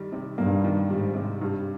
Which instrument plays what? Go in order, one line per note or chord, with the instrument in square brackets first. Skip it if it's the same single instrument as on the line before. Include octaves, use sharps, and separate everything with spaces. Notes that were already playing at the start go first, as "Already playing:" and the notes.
Already playing: [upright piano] D#3 G3
C3
[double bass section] G2 [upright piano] A#3
[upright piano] D#3
[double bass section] G#2 [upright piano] G3
[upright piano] C3
G2